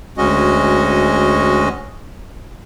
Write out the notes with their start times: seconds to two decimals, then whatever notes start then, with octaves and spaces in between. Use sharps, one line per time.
0.18 D2 G#3 C#4 F#4 D#5